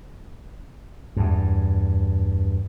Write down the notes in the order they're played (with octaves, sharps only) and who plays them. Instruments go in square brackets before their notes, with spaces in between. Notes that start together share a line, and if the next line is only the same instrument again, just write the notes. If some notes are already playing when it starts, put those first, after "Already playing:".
[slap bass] E2 G2